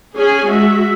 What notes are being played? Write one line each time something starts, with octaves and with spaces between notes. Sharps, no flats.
C#4 G#4 G#5
G#3 F#4 E5